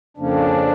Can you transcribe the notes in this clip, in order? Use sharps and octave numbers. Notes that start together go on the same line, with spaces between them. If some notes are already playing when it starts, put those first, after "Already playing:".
F2 C#3 F3 A#3 C#4 D4